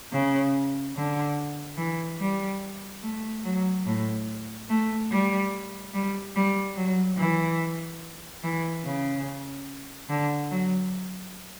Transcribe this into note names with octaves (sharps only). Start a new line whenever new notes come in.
C#3
D3
E3
G3
A3
F#3
A2
A3
G3
G3
G3
F#3
E3
E3
C#3
D3
F#3